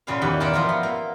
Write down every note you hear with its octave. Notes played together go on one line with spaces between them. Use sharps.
A#2 C#3 F#4 B4 F5
E2 D#3 G4 B4 F#5
A#2 A#4 D5 A5 B5
F3 F4 A#4 C5 E5 B5
B3
A#3